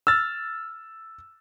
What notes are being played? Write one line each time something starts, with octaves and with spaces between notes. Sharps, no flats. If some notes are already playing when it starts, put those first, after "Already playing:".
E6 F6 A6